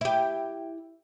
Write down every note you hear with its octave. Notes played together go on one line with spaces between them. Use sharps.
E4 G4